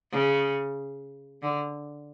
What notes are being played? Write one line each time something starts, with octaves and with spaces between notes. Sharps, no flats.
C#3
D3